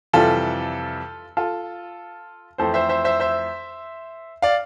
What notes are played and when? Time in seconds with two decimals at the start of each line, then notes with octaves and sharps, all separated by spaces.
0.13 F2 C3 E3 G3 F4 A4
1.37 F4 A4
2.58 F2 E3 A3 C4 A4 C5
2.74 C5 E5
2.89 C5 E5
3.04 C5 E5
3.20 C5 E5
4.42 D5 F5